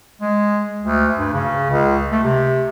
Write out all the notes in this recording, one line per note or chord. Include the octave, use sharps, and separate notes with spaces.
G#3
D2
G2
C#3
C#2
A3
C3